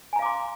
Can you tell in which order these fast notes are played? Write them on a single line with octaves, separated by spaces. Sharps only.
G#5 A#5 F5 D6 C6